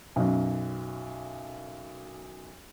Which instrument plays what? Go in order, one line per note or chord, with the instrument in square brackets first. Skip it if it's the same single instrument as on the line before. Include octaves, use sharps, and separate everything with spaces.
[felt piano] B1 F#2